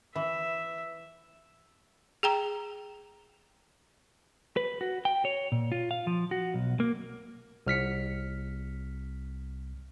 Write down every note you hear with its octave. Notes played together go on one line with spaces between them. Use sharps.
E3 E5
G#4 G5 A#5
B4
F#4
G5
C#5
A#2
F4
F5
F3
F#4
B1
A#3
C2 F6 B6 C#7